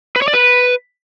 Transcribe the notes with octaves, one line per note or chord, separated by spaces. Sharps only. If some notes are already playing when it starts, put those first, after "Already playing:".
B4
C#5
D5
B4